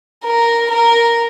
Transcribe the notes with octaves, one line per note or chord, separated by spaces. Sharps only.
A#4
A#4